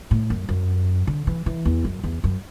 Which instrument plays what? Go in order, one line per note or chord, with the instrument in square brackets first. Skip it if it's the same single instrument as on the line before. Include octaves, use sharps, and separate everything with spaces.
[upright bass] A2
F#2
F#2
D3
E3
E3
E2
F#2
E2
F#2